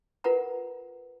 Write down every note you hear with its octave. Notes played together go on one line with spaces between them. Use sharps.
F4 A#4 B4 F#5 A#5